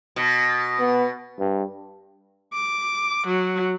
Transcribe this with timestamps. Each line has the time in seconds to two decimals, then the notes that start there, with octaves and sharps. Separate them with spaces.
0.16 B2
0.79 B3
1.39 G2
2.53 D6
3.27 F#3